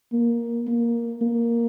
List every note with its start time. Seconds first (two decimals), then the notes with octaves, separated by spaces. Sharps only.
0.13 A#3
0.68 A#3
1.22 A#3